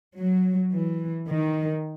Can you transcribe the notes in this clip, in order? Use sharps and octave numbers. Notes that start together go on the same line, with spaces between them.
F#3
E3
D#3